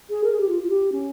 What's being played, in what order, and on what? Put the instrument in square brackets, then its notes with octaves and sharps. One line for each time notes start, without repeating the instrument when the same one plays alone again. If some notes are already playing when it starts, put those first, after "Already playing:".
[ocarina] G#4
A#4
G#4
G4
F4
F4
G4
C#4